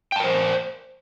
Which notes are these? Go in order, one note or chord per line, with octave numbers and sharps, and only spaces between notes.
A#4 C5 G5 A5